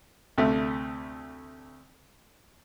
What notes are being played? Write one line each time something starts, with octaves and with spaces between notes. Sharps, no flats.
D2 C3 A3